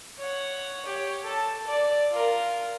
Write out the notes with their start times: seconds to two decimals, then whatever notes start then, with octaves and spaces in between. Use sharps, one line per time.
0.18 C#5 F#5
0.85 G4 C#5
1.23 A4 A5
1.67 D5
2.11 F4 A#4